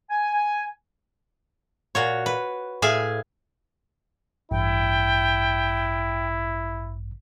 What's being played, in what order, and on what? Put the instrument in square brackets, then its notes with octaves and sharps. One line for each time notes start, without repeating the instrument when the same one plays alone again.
[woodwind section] G#5
[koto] A#2 F#4 C#5
B4
A2 G#4 E5 F5 G#5
[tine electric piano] A1 G2 [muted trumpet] E4 [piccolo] G5